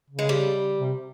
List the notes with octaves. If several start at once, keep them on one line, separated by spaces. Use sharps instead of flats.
C#3
G#3
G3
C3